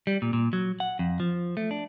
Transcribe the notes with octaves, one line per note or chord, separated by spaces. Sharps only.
G3
A#2
A#2
F#3
F#5
F2
F3
A3
D4